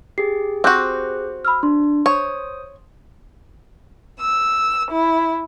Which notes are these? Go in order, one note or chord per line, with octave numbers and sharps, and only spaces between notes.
G4 G#4 C7
C4 F#4 D6 F#6 G6
B5 E6 F6
D4 C6
C5 C#5 D#6
E6
E4